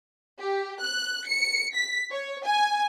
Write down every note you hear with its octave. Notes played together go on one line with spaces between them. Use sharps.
G4
F#6
C#7
B6
C#5
G#5